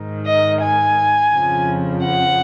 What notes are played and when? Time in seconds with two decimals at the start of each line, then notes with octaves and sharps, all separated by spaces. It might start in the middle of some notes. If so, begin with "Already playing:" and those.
Already playing: G#2 D#3
0.26 D#5
0.62 G#5
1.33 F2 C#3 F3
2.05 F#5